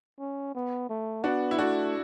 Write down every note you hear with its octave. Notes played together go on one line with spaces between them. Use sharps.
C#4
B3
A3
B3 D4 F#4
E4
A3 D4 F#4